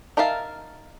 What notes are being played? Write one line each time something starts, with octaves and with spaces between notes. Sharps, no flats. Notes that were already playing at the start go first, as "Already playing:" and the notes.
D#4 A#4 E5 F5 A5